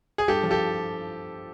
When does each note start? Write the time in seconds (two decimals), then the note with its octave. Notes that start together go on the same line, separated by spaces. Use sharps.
0.18 G#4
0.28 G2 G4 A4
0.43 F3
0.51 G4 A4